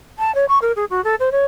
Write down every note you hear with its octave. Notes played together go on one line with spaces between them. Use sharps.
A5
C#5
C#6
A#4
G#4
F#4
A4
C5
C#5